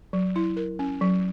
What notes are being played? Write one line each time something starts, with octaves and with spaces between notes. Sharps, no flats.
F#3
E4
A#4
C#4
F#3